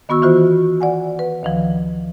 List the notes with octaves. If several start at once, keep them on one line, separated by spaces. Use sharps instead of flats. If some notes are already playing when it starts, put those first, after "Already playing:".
D#3 B3 F#4 C#6 E6
E3 F4 F#4 C5
D5 F#5 G#5
B4
D2 D#3 F3